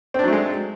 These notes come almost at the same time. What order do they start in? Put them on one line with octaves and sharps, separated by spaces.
C4 D4 F#3 A3 G#3